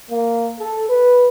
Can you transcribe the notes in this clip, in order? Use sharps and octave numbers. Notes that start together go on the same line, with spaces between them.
A#3
A4
B4